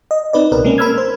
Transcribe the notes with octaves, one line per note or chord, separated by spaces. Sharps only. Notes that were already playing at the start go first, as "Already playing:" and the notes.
D#5
C4 D#4 B4 D5
C2 B2 A#4 B4
G#3 A#3 C4 C#4
A#4 B5 E6 F6 G#6
C5